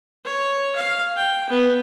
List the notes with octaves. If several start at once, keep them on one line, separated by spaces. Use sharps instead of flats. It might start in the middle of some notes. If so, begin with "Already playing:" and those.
C#5
F5
G5
B3